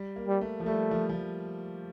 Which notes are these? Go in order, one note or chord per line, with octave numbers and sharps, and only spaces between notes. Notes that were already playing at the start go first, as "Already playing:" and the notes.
Already playing: G3
A#3
G3
A3
F3
G3 A3
F3
F3